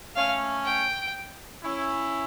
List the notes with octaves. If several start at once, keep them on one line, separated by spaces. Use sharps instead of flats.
A3 C#4 F5
G5
C#4 E4